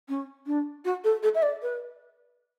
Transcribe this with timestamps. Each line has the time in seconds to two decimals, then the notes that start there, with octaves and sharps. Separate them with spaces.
0.09 C#4
0.46 D4
0.85 F#4
1.04 A4
1.23 A4
1.35 E5
1.43 D5
1.62 B4